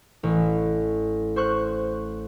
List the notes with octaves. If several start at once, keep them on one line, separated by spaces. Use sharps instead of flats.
A1
C5 C#6 F#6